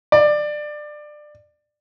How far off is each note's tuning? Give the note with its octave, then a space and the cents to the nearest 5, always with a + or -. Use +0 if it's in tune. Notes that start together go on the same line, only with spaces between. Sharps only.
D5 +20